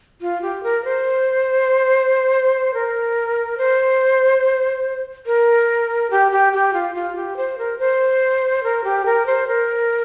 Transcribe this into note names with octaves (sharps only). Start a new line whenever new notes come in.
F4
G4
A#4
C5
A#4
C5
A#4
G4
G4
G4
F4
F4
G4
C5
A#4
C5
A#4
G4
A#4
C5
A#4